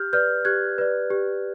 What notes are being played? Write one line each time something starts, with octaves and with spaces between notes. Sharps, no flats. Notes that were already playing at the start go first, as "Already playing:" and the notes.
Already playing: G4 F6 G6
B4 D5 F6 G6
G4 F#6 G#6
B4 D5
G4